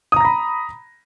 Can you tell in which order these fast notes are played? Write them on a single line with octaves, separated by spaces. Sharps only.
D#6 A#5 A#6 B5